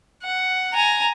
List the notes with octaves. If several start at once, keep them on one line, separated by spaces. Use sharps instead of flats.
F#5
G#5 A#5